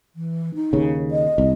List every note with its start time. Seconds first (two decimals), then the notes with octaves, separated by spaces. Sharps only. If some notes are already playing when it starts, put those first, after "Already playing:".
0.16 E3
0.55 D#4
0.73 D#2 C#3
1.11 D#5
1.38 C2